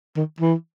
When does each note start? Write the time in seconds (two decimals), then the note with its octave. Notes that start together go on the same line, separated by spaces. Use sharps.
0.17 D#3
0.40 E3